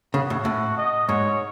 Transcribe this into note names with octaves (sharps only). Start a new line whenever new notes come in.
C#3 F#4
A2
A2
D#5
G#2 C#5